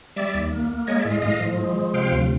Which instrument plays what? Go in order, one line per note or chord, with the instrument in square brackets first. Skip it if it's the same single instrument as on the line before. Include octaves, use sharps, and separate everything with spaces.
[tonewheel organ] G3 D5 E5
D#2
A#3
A#3
G#3 C#5 D#5
D5 E5
A2
D#5 F5
A2 D#5 F5
F3
G#3
F3
C3 F5 G5
D2